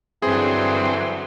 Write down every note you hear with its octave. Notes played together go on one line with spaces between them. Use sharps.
G2 D3 E3 F#3 C4 G#4